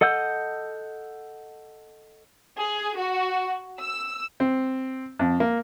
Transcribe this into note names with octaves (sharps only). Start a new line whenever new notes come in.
A4 D#5 F#5 E6 G6
G#4
F#4
E6
C4
F2
A#3